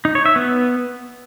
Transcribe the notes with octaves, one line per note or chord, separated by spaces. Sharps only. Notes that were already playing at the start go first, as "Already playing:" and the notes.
D#4
C#5
E5
B3